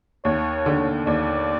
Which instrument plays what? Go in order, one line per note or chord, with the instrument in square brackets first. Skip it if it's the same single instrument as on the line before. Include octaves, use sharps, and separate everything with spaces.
[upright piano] D#2 [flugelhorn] C#5
[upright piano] D3
[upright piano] D#2 [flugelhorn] D5